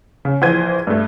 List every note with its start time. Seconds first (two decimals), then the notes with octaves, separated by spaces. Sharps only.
0.25 C#3
0.42 A#1 E3 C5 G#6 D#7
0.87 G2 A3